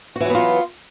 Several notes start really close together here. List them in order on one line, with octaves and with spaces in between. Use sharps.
F#4 E3 F#3 B3 F4